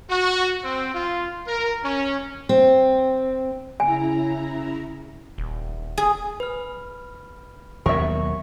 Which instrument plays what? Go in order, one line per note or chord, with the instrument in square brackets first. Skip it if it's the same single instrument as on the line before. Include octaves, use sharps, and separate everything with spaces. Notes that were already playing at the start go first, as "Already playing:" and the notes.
[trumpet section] F#4
C4
F4
A#4
C#4
[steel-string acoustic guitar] C4
[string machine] C#3 E4 A#5 [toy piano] G#5
[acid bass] D#1
[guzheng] G#4
[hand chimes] B4 F6
[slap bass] D#2 B2 F#3 [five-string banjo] A#4 E5 [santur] C#6